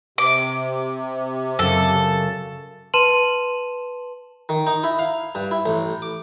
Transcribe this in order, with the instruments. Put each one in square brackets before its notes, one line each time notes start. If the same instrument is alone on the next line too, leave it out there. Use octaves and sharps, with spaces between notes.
[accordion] C3 [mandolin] D6
[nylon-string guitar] F#2 C#3 [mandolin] A4
[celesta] B4 A5 C6 D#7 E7 F#7
[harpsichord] D#3
D#4
E4
F5
G2
E4
A1
D6